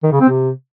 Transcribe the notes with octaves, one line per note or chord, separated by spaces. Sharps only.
D#3
C#3
C4
C3